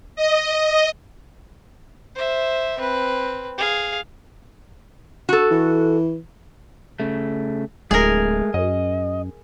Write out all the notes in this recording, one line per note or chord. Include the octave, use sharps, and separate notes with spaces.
D#5
C5 E5
C4 B4
G#4 F5
F#4 A4
E3
C#3 A3
D1 G#3 A3 G#4 A#4
F#2 D#5